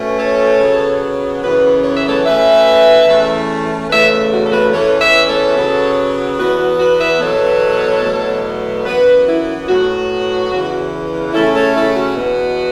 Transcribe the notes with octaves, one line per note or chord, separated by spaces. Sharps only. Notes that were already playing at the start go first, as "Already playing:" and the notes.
Already playing: B2 A3 C#4
A4 C#5
C#3 F#3 B3
F#2 C#3 E3 B3 F#4 B4
C#5
E5
A4 C#5
B2 A3 C#4 B4 E5
E2 E3 A3 C#4
E2 C#3 E3 A3 B4 E5
F#4
A4
F#4 B4
E2 E3 C#4 A4 C#5
B4 E5
A4 C#5
C#3 F#3 B3
E2 E3 B3 F#4 B4
F#4
F#4 B4
B4 E5
E2 B2 F#3 B3 A4 C#5
E2 B2 F#3 A3
F#2 E3 B3 F#4 B4
E4
A2 F#3 B3 F#4
E2 C#3 E3
C#3 A3 C#4 E4 A4
A4 C#5
E4 A4
F#4
E2 B2 B3